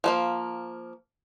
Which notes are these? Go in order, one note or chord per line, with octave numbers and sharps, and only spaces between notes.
F3 G3 A#3